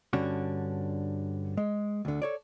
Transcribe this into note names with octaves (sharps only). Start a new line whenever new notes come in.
G2 D3 C#4 D4 F#4
G#3
D2 D3
A4 C#5 D5